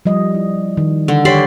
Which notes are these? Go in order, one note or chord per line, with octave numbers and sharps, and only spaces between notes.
F3 G3 D#5
E4
D#3
D3
G4 C#5 D5 B5 C6